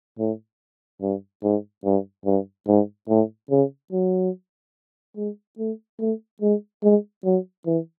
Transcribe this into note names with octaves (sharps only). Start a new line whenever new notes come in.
A2
G2
G#2
G2
G2
G#2
A2
C#3
F#3
G#3
A3
A3
G#3
G#3
F#3
E3